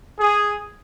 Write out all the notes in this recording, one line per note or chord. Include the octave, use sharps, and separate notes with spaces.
G#4